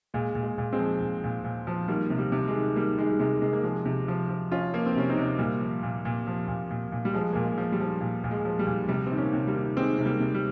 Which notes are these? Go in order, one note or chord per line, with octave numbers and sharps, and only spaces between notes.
A#2 G#3
A#2
G#3
A#2
G#3 C4
F3
A#2
A#2
A#2
F3
D#3 G3 A#3
C3
G3
C3
G#3
D#3
D#3 G3 A#3
D#3 G#3
G3
C3 G#3
C3 G#3
A#3
F3 G#3
C3
F3
F3
F3 C#4 F4
F3 A#3
C4
C3 C#4
C4 D#4
C3
A#2 G3 A#3
F3
A#2
A#2
F3
A#2
A#2
A#2
G3
F3 G#3
A#2 A#3
G#3
F3
G3
F3
A#2
A#2
G#3
F3
G3
A#2
C3 G3
D#3 C4
A#3 C#4
C3
G3 A#3
D#3
D#3 G#3 C4
C3
G3 A#3
C3
G3